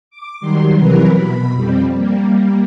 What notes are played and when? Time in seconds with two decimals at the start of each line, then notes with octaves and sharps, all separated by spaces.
0.11 D6
0.41 D#3 F#3 G3 C6
0.76 C3 E3 F#3 A#4 B4
1.10 B2 B5
1.54 F2 G3 C4
1.94 G3 A#3